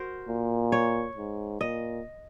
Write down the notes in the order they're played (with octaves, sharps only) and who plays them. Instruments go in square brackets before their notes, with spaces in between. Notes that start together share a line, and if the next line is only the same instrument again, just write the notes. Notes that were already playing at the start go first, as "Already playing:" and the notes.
Already playing: [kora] F#4 A#4 C5
[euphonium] A#2
[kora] C#5
[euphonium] G#2
[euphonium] A#2 [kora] D#5